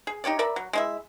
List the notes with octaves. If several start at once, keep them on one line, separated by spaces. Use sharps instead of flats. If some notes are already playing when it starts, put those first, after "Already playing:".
G#4
D#4 G4 C#5 D5
A#4 D5 E5 B5
F#3
G#3 E4 E5